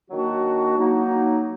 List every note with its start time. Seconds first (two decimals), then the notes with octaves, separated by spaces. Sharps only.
0.09 D#3 F#3 A#3 D4 F#4
0.76 F#3 A#3 D#4 F#4